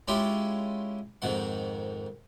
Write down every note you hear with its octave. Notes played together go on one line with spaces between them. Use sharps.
G#3 C#4 E4 F4 G4 G#4
F2 G#2 D#3 F#5